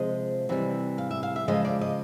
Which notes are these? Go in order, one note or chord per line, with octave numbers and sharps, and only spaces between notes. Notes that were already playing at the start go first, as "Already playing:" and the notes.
Already playing: C3 F3 G#3 D#5
C3 E3 G3
F5
E5
F5
E5
C#3 F3 G#3 D#5
D5
D#5